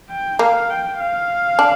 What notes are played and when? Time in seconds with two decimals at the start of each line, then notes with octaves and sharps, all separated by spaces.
0.10 G5
0.39 A#3 F5
0.69 G5
0.99 F5
1.59 D4